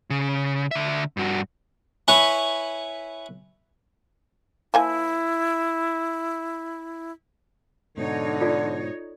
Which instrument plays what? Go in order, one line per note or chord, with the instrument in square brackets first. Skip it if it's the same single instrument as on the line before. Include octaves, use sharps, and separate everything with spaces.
[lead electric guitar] C#3
D3 E5
G2 F#4
[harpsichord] E4 B4 C#5 G#5 B5 C#6
[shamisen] F3 A#3 G#5 [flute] E4
[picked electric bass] G#2 B2 [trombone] D3 [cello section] D#4 C#5
[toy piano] F4 A4 D5